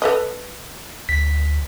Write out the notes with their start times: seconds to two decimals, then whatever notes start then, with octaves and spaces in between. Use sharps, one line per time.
0.02 A4 B4 D#5
1.09 D2 B6